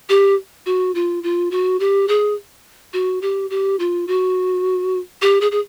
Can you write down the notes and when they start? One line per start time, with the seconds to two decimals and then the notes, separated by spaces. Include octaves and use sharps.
0.09 G4
0.66 F#4
0.95 F4
1.23 F4
1.51 F#4
1.80 G4
2.08 G#4
2.93 F#4
3.22 G4
3.50 G4
3.79 F4
4.07 F#4
5.22 G4
5.41 G#4
5.51 G#4